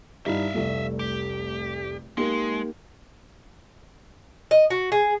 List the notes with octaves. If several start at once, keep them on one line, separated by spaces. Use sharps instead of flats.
G2 D#4 E4 E5 F5
F1 C2 A3
G4
G#3 A#3 D#4 G4
D#5
F#4
G#4